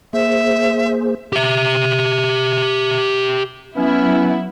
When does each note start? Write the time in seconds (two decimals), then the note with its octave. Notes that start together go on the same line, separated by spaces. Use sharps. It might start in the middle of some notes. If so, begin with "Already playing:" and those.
0.13 A#3 G#4 C5 E5
1.33 G4 E5
3.76 F#3 B3 C#4 E4